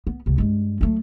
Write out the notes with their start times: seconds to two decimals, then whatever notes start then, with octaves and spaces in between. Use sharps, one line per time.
0.07 B3
0.26 C#2 C3
0.38 G2 G#3
0.81 F#3 A3